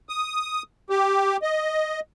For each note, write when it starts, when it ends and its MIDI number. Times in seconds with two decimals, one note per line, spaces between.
0.09 0.63 87
0.90 1.37 67
1.42 2.00 75